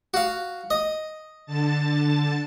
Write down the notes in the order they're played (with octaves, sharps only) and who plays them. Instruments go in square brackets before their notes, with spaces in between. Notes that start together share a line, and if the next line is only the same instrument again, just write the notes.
[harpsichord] F#4 F5
D#5
[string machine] D3 A5 A6